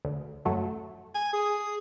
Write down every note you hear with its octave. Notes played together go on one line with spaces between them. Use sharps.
D2
F#2 F#3 A3
G#5
G#4